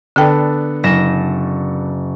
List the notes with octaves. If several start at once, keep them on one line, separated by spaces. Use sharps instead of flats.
D3 B3 D4 A4 G5
F#1 A#6 E7